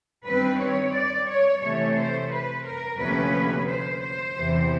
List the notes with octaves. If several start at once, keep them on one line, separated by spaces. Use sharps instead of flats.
G2 D#3 G3 C4 B4
C#5
D5
C#5
C3 E3 A3 C#5
C5
B4
A#4
D2 C3 F3 A#3 C#4 B4
C5
C5
E2 C3 E3